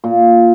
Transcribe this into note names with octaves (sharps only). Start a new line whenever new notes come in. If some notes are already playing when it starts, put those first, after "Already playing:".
A#2